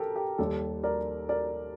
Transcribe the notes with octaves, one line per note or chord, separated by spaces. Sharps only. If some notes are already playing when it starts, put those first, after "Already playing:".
Already playing: G4 A4 A#4
G4
D#2 D#3 G3 A4
A#4 D5
A#4 D5